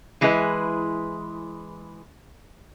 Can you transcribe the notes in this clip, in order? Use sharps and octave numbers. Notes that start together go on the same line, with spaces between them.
E3 G#3 E4 G#4 B4